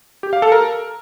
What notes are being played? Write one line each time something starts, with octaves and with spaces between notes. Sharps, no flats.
G4
F5
A4
A#4